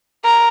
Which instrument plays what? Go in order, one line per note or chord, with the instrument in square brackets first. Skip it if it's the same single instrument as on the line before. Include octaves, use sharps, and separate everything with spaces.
[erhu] A#4